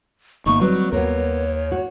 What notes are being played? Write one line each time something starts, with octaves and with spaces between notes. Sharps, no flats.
G1 A#3 D#4 C#6
F#3 G3 C4 B4
D#2 B3 A#4 C#5
F#4